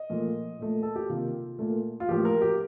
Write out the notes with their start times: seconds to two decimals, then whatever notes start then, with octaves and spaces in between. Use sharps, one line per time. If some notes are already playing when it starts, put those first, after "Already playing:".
Already playing: D#5
0.10 A#2 F3 A3
0.59 A#2 A3
0.83 A4
0.96 G4
1.09 C3 D#3 A#3 F4
1.59 A#2 A3
2.00 F4
2.09 A2 F3 A#3 G4
2.25 A#4
2.41 G4